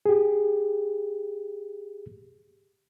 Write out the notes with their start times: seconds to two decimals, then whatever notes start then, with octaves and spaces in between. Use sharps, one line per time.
0.06 G4 G#4